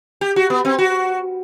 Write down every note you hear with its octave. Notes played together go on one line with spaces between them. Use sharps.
G4
F#4
B3
C4
F#4